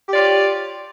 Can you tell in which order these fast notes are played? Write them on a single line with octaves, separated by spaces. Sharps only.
G4 D5 F4 C#5